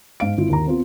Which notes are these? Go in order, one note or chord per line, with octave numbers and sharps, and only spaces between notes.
G#2 F5 D7
G#1 E4 F4
D#2 A#5
B3 C4 F4